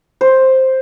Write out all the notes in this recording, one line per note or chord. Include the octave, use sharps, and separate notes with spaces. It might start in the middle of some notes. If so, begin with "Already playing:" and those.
C5